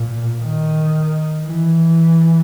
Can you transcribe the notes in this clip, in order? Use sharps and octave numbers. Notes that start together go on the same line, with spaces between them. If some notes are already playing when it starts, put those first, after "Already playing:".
Already playing: A#2
D#3
E3